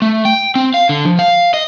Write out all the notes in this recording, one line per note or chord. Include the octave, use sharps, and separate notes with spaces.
A3
G5
C4
F5
D3
F3
F5
D#5